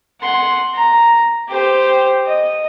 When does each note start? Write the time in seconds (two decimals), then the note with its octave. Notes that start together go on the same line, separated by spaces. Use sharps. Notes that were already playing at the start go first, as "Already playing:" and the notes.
0.21 F#5 C6
0.74 A#5
1.49 G4 C5
2.26 D#5